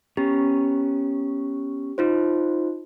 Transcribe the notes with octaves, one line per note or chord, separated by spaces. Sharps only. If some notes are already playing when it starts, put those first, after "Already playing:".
B3 C#4 G4 A#5
D#4 F4 C5